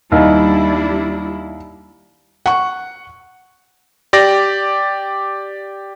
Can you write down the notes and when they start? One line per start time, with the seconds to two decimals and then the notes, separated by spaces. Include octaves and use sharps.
0.12 D#2 G3 D4 E4
2.46 F#5 C#6
4.13 G4 D5 A#6